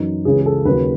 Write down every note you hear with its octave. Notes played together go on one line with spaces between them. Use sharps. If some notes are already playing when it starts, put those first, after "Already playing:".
Already playing: F#2 E3 D#4
C#2 C#3 E3 G#4
G#4
A4
D#2 C#3 F#3 B4